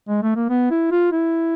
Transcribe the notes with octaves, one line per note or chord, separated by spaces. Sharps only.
G#3
A3
A#3
B3
E4
F4
E4